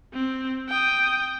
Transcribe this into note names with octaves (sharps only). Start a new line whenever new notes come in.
C4
G5 D#6